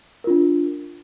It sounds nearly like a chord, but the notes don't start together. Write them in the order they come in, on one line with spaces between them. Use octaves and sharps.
A#4 F4 D4